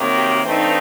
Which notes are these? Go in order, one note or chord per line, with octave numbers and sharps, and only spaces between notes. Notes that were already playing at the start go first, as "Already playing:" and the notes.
Already playing: C3 D#3 F#3 A#3
G4
G2 E3 A3 C4 D#4